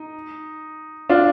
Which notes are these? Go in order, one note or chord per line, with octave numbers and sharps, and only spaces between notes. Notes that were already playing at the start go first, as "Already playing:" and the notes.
Already playing: D#4
D4 F4